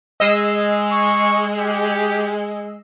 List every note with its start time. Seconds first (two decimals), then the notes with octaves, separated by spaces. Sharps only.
0.20 G#3 D#5 E6 C7
0.93 C#6
1.58 G4